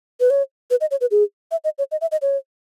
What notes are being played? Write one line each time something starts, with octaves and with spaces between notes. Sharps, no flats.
B4
C#5
B4
D#5
C#5
B4
G#4
E5
D#5
C#5
D#5
E5
D#5
C#5